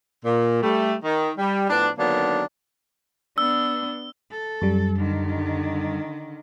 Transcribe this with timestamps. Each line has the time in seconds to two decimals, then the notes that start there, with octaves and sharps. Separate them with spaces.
0.24 A#2
0.61 G3 A3
1.03 D#3
1.38 G3
1.70 A2 F3 B3 D4
1.98 D3 D#3 F#3 A#3 B3 D4
3.38 B3 D4 E6
4.31 A4
4.61 F#2 G3
4.97 D3 D#3